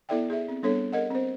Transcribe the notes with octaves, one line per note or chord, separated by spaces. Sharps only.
B3 E4 A4 D5 E5 G5
G#4 E5
C4
G3 B3 D4 A4 C#5
G#4 A#4 D#5 F#5
C4 C5